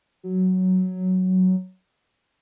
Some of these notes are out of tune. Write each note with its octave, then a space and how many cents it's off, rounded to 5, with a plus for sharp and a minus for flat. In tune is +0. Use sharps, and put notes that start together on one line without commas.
F#3 +5